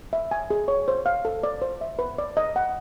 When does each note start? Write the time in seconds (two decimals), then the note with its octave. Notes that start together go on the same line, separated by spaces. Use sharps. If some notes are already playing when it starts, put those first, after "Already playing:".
0.13 E5
0.31 G#5
0.50 G#4
0.68 C#5
0.88 C5
1.06 F5
1.25 A4
1.43 D5
1.62 C5
1.81 E5
1.99 B4
2.18 D5
2.37 D#5
2.56 F#5